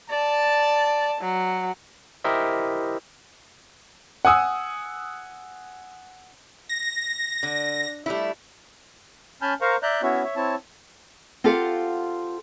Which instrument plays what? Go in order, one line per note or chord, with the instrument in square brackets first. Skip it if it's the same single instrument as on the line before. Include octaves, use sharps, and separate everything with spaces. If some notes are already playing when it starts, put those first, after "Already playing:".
[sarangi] D5 [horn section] A5
[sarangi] F#3
[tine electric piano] E4 G4 A#4 C5 D#5 E5
[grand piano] F#5 G#5 D#6 E6
[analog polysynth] A#6
[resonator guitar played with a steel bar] D3
G3 A3 E4
[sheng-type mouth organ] C#4 G#5 A5 B5 F6 G6
A#4 C5 F5 A#5 C#6
D5 E5 A#5 F#6 G6
B3 C#4 E4 F#4 C#5 E5
C#5 E5
C4 E4 C#5 A5
[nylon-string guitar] C4 F4 G4 A4 F5 F#5